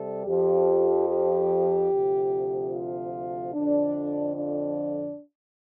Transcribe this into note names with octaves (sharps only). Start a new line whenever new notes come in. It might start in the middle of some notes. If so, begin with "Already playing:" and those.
Already playing: C3 G3 A4
F2 F3 G4
G4
D2 C3 F3
F4
F2 D3 F3 D4
D4